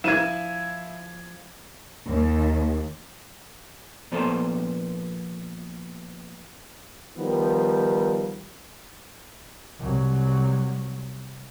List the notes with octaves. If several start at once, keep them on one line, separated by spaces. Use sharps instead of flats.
F3 E4 G#6 D#7 E7
D#2
A#2 F3 B3 A4 C5
D#3 F3 G3 B3
C2 F#3